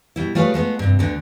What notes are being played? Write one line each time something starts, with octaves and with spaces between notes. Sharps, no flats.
B2 G3 E4
G3 A3 F4 G#4 B4 C#5
G#3 A3 B3 F4
G2 C3
D2 D3 B3